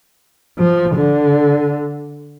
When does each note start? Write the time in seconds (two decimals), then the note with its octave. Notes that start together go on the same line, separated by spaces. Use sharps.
0.59 F3
0.96 D3